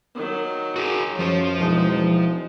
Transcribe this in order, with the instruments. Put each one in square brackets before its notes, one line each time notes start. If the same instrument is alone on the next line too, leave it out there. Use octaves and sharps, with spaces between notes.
[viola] D#3 F#3
[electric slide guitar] F#4 G#4
[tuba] F#2 [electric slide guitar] F3 C5 [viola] C#5
[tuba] E1 [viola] G#3 D#4